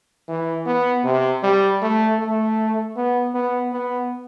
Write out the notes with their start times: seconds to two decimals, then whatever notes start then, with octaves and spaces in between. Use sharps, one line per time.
0.28 E3
0.66 B3
1.04 C3
1.43 G3
1.82 A3
2.20 A3
2.96 B3
3.35 B3
3.73 B3